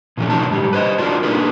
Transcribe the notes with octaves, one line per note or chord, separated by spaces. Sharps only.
A#2 D3 F3 A3 C#4
B2 D3 F#3 G3 D#4 A5
G#2 G3
B4 C5 D#5
D4 F4 F#4 A4 A#4
A#3 D4 D#4 G#4 B4